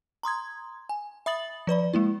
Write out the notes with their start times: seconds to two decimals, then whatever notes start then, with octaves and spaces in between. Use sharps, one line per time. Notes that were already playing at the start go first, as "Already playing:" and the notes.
0.23 A#5 C6 D#6 G#6
0.89 G#5
1.26 E5 B5 D#6 A6 F#7
1.67 F3 B4 D5 B5
1.93 G#3 A#3 E4